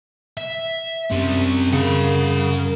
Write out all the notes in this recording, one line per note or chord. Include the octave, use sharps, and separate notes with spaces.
E5
F#2 G3 C4
C#3 A#4 F#5